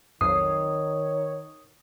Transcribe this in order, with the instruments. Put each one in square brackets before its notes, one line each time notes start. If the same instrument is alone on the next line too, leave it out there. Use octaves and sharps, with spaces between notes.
[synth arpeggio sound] B1 F2 C7 [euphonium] D#3 [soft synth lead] C#5 [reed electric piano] D#6